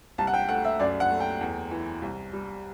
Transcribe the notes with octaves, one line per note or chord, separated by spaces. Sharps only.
C2 A5
F#5
G5
A3 F#5
E5
F#2 D5
F#5
A3
G5
E2
E3
C2
G3